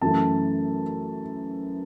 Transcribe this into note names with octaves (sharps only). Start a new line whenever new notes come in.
F#2 E3 A3 A5